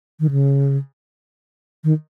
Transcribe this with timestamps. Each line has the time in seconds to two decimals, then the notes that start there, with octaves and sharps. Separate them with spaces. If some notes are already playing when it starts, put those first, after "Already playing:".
0.20 D#3
0.31 C#3
1.84 D#3